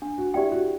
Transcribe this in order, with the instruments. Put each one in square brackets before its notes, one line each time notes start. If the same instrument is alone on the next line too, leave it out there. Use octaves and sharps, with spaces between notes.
[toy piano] D4
[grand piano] F#4
[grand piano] E4 [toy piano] G4 D5 G5
[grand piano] F#4